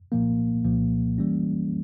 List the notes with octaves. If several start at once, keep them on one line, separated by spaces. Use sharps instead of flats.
C2 A#2 F3 A#3
C2 A#2 F3 A#3
E3 G3 A#3 C#4